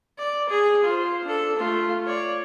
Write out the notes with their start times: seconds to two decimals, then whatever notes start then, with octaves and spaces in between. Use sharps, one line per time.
0.18 D5
0.49 G#4
0.84 F4 C5
1.24 D4 A4
1.57 A3 F4
2.06 C#5 D5